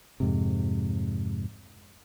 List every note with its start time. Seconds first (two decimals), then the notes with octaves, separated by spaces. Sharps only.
0.20 F2 G#2 C3